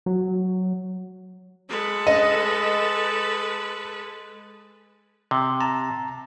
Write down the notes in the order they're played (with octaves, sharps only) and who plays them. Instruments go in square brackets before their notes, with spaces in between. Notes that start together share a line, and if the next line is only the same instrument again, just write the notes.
[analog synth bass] F#3
[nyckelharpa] G#3 [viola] A4 B4
[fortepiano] D#5
[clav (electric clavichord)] C3
[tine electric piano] A5 A#5